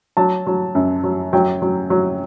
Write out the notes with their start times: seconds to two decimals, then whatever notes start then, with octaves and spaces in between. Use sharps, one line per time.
0.17 F#3 A5
0.47 F#3
0.75 F#2
1.03 F#3
1.33 F#3 G5
1.62 F#3
1.90 F#3